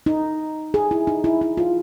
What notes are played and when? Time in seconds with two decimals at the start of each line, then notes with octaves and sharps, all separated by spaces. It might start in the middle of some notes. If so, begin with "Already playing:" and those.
0.06 D#4
0.74 G#4
0.91 E4
1.07 D#4
1.24 E4
1.41 E4
1.57 F4